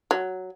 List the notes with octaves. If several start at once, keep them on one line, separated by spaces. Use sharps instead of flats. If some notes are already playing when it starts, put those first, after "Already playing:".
F#3